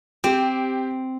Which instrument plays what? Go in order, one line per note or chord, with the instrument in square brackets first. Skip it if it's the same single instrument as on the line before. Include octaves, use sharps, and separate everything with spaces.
[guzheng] C4 [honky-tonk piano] G4